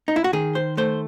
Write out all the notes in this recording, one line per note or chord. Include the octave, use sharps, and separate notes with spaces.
D#4
E4
F#4
D#3 G#4
C5
A3 C5